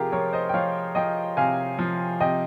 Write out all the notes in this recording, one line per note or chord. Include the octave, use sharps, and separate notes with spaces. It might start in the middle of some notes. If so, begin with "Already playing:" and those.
Already playing: C3 F3 F4 G4 G#4 A#4
F3 A#4 C#5
C5 D#5
G5
F3 C#5 F5
F3 D#5 G5
C3 F5 G#5
F3
C3 D#5 G5